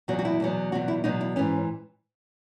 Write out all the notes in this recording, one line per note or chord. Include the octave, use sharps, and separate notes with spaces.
E2 B2 F#3 F#4
F#4
E4
E2 B2 F#3
E2 B2 F#3 F#4
E4
E2 B2 F#3 D#4
E4
G#2 E3 C#4